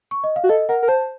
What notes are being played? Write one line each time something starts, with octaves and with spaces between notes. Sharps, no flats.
C#6
D#5
F5
F#4
A4 D#5
A#4 F#5
A#4
C5 A5